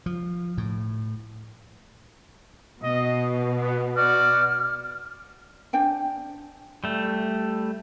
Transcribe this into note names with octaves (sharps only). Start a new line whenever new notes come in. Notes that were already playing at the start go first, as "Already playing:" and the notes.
F3
A2
B2 D#5
B3
B3 F#4 D5 F6
D4 C5 G5 G#5
G3 A3